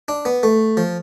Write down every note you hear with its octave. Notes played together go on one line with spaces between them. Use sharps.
D4
B3
A3
F3